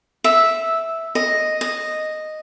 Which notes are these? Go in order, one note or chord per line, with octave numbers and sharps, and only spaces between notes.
E5
D#5
D#5